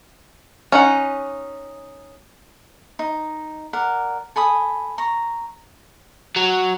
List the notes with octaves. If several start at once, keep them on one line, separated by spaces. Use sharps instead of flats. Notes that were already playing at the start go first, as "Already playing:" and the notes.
C#4 D#4 F#5
D#4
A#4 D5 F#5
A4 G#5 B5 D#6
A#5 C#6
F#3